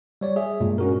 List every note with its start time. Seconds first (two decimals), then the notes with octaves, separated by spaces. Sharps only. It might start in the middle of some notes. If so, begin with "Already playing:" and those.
0.21 G3 C#5 D5
0.36 G#4 E5
0.61 G2 A#2 G#3
0.78 C#4 F#4 A#4